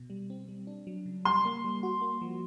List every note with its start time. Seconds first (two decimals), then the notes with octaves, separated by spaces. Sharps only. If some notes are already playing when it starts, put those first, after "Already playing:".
Already playing: B2
0.10 G3
0.30 C4
0.48 G3
0.67 D4
0.87 F#3
1.06 C#3
1.25 G3 C6
1.45 A#3
1.64 G3
1.83 F#4
2.01 A#3
2.21 F3